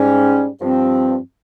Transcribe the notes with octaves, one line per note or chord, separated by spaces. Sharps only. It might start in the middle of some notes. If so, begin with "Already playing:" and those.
Already playing: G#2 G3 C#4
G2 F3 C4